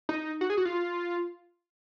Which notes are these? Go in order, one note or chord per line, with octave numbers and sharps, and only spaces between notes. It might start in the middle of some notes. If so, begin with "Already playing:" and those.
D#4
F#4
G#4
F#4
F4